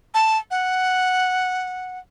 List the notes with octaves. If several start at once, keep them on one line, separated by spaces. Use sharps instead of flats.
A5
F#5